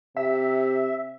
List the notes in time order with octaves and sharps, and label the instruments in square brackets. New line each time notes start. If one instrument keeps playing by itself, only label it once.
[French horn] C3 [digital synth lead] E5